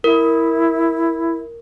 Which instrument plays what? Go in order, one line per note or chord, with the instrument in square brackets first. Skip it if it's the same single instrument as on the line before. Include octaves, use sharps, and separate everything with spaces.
[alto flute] E4 [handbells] A#4